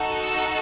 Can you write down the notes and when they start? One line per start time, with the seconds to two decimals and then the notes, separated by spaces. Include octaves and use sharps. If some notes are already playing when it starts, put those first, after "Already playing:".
Already playing: D#4 F#4 A4
0.24 E6